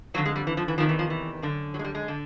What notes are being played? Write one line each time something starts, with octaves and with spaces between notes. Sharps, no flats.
F2 D3 F#3
G#3
G3
E3
F3
E3
E2 C3 D#3 F3
E3
F3
E3
F#2 D3
F#3
G#3
G3
G#3
D3